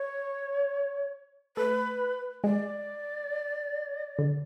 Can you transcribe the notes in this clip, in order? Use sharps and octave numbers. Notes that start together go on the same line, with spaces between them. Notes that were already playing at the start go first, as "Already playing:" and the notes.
Already playing: C#5
A3 B4
G#3 D5
D3